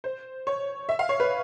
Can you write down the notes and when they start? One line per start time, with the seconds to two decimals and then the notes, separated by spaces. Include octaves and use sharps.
0.04 C5
0.47 C#5
0.89 E5
0.99 F5
1.09 C#5
1.20 B4